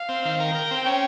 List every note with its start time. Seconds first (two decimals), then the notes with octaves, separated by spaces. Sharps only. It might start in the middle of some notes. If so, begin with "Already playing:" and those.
Already playing: F5
0.09 C4
0.25 D#3
0.40 A#4 G5
0.55 A#4
0.71 C4
0.86 C#4